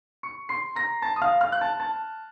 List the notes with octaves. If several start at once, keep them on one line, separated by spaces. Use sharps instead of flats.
C#6 C#7
C6 C7
A#5 A#6
A5 A6
D#6
F5 F6
F5 F6
F#6
A5 A6
A5 A6